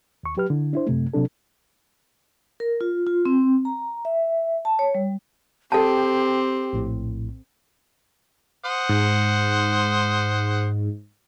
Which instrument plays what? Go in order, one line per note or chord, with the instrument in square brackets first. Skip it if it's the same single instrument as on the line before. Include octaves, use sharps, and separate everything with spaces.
[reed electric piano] D#2 C#6
F#3 G4 B4 F6
D3 E4
D4 E4 C5
F#2 C3 A3
C3 F#3 D4 A4
[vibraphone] A#4
F4
F4
C4
A#5
E5
A5
C#5
G3
[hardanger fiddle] C4 [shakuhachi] G4 [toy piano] A4 A5 [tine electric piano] G5
[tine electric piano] A#1 A2
[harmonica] C5 F#5 D#6
[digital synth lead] G#2